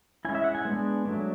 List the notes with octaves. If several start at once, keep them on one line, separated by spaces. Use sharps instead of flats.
G#3 C#4 E4 G#5
E5
F#5
G#5
G#3 B3 D4
F#3 A3 D4